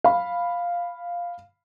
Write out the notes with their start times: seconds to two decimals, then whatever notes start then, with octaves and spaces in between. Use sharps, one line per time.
0.04 F5 B5